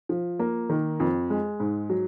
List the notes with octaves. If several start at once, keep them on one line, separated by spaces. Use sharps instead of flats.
F3
A#3
D#3
F2
G#3
G#2
F#3